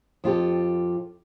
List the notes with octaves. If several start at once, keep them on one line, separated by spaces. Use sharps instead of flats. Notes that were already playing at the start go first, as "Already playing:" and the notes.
F2 F4 G4 A4